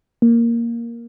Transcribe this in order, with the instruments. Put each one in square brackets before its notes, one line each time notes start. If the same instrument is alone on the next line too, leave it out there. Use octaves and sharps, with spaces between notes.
[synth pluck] A#3